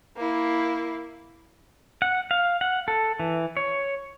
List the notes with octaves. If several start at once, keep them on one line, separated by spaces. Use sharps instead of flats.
A#3 E4
F#5
F5
F#5
A4
E3
C#5